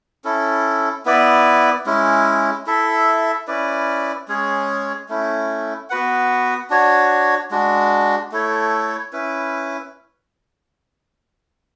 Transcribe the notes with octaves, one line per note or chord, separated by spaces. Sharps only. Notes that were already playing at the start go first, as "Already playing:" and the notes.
C#4 E4 A4
B3 E4 B4 D5
G#3 C#4 E4
E4 A4 E5
C#4 E4 B4 D5
G#3 C#4 G#4 C#5
A3 C#4 E4
B3 F#4 B4 F#5
D4 F#4 C#5
G#3 D4 F#4
A3 E4 A4 C#5
C#4 E4 B4